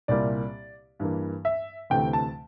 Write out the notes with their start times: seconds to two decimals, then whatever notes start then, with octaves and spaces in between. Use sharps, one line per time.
0.08 C2 A#2 G3 A#3 E4 D5
1.00 G2 E3 A#3
1.45 E5
1.90 D2 C3 E3 A3 G5
2.13 A5